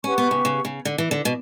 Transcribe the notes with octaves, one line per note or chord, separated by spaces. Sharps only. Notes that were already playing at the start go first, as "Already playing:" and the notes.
C#4 G4 B4 F#5 C#6
B3
C#3
C#3
C#3
D3
E3
D3
B2